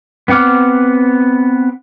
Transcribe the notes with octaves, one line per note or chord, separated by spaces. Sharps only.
B3 C4 F#5 D6 F6